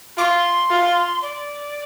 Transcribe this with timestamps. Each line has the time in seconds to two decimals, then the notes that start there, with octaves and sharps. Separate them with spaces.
0.18 F4 D6
0.22 C6
0.71 F4
1.22 D5